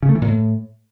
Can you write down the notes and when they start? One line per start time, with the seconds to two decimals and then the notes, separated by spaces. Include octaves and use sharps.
0.03 C#3
0.09 A3
0.15 E3
0.22 A#2
0.28 A2